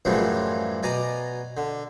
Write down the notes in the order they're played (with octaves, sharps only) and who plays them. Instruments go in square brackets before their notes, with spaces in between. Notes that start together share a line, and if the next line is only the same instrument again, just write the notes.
[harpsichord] F#2 A2 C#3 E3 F3 G3
B2 D5 G#5 A#5
D3